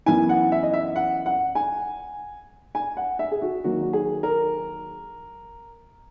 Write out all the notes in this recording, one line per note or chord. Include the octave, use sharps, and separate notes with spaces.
F#2 E3 B3 E4 G#5
F#5
E5
D#5
E5
F#5
F#5
G#5
G#5
F#5
E5
G#4
F#4
D#3 F#3 A#3 F#4
F#4
G#4
A#4